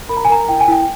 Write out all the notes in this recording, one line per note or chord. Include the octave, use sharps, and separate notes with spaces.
A#4 B5
A#5
G#5
A#4 A#5
E4 G5
G#5
E4 G5